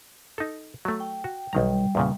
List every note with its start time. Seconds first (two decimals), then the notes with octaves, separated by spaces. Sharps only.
0.38 D#4 A4
0.85 F#3 A3
1.00 G5
1.24 F#4
1.53 B1 D#3 G3 G5 A#5
1.95 E2 A#2 C#3